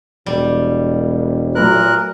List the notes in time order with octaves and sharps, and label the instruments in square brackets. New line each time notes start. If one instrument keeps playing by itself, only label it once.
[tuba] E1 [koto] G3
[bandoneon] A#2 A#4 F#6 [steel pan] F#3 A3 B4